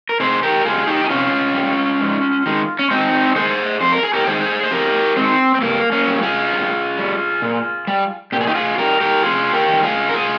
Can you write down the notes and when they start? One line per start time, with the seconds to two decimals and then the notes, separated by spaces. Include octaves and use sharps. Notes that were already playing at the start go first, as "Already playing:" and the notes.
0.09 A#4
0.20 C3 G#4 C5
0.43 G4 A#4
0.65 G3 F4 G#4
0.87 D#4 G4
1.04 D#4
1.10 C3 C#4 F4
1.55 G3
2.01 G#2
2.46 D#3 G#3
2.79 C#4
2.91 G#2 C4 D#4
3.35 D#3 G#3 G#4 C5
3.81 F2 C5
3.92 A#4
4.03 G#4
4.14 G4 A#4
4.26 D#3 G#3 G#4 C5
4.63 C5
4.71 F2 G4 A#4
5.16 D#3 G#3 C4
5.55 C4
5.62 G2 A#3
5.92 A#3 C#4
6.07 G3
6.22 F4 G#4
6.53 G2
6.98 G3
7.42 A#2
7.87 G3
8.32 A#2 G4
8.41 G#4
8.47 D#4 G4
8.55 F4 G#4
8.78 G3 G4 A#4
9.00 G4 A#4
9.23 F2 F4 G#4
9.53 G4 A#4
9.68 D#3 G3
9.83 F4 G#4
10.09 A#4
10.14 F4 G#4